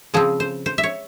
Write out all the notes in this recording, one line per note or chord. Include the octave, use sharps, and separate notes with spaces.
C#3 F3 C4 G#4
C5
C5
E5
C#5